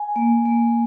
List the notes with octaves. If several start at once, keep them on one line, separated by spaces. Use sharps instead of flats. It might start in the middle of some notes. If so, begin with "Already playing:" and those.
Already playing: G#5
A#3
A#3